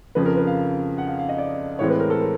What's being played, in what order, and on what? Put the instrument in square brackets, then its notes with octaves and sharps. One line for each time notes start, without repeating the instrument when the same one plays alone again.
[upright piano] F2 C#3 F3 B4
A#4
B4
F5
F#5
F5
F5
D#5
D5
A2 E3 G#3 C4 C#5
B4
A#4
A4
A#4